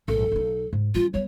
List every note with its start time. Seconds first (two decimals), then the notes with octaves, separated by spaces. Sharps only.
0.08 A#1 G#2 A4
0.32 B1 D#4
0.73 G#2
0.95 G3 C#4 F4
1.14 G3 B3 C#5